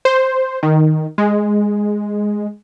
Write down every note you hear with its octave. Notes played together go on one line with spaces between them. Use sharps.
C5
D#3
G#3